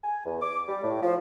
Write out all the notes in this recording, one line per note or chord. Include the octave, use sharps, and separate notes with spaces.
G#5
E2
D6
G3
A2
F3